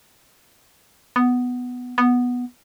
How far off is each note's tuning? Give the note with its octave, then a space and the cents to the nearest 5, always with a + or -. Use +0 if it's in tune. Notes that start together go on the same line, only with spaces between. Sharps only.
B3 +5
B3 -5